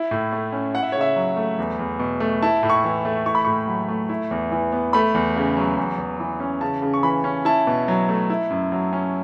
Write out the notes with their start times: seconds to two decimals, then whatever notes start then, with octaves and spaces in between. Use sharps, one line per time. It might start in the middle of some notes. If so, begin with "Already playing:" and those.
Already playing: E4
0.11 A2
0.32 A3
0.52 C#4
0.74 E4 F#5
0.83 E5
0.92 C#3 C#5
1.01 E5
1.16 F#3
1.37 A3
1.59 E2
1.79 E2
1.99 B2
2.20 A3
2.43 E4 A5
2.63 A2
2.70 C#6
2.84 E3
3.05 A3
3.26 E4 C#6
3.35 B5
3.45 A2 C#6
3.67 F#3
3.88 A3
4.09 E4
4.31 E2
4.52 E3
4.72 B3
4.93 A3 B5
5.14 E2
5.36 C#3
5.57 F#3
5.77 E2
5.98 E2
6.19 E3
6.40 C#4
6.61 C#3 A5
6.82 C#3
6.94 C#6
7.03 E3 B5
7.24 C#4
7.45 E4 A5
7.67 B2
7.88 F#3
8.09 A3
8.30 E4
8.50 F#2
8.72 F#3
8.93 C#4